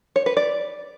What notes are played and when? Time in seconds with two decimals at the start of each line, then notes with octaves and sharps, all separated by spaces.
0.16 C#5
0.26 B4
0.37 D5